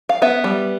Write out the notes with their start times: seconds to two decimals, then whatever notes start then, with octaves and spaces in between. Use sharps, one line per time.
0.09 F5
0.22 B3 E5
0.44 G3